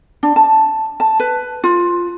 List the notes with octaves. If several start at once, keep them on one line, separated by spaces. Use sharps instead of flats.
D4
A5
A5
B4
F4